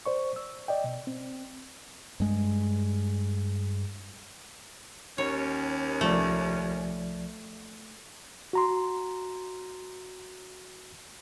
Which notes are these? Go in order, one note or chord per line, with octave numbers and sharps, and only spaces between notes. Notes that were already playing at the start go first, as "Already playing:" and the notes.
C5 D5 C#6
E6
D5 D#5 G5
B2
C4
G2 G#3
D#2 C#4 C#5
C2 F3 A3 D5
F#4 A#5 C6